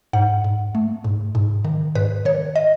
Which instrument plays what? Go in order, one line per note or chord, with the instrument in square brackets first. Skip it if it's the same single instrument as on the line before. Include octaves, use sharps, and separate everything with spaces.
[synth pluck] G#2 F#5
G#2
A3
G#2
G#2
D#3
G#2 B4
D#3 C#5
D#5